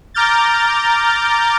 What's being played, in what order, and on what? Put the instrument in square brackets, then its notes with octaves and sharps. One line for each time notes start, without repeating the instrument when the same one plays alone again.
[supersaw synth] A#5 D6 F6 G6 A6